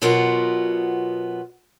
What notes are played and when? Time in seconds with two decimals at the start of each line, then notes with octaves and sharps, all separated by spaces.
0.02 B2 F#3 B3 F4 A#4 F#5